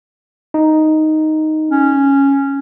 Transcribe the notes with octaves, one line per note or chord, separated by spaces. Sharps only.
D#4
C#4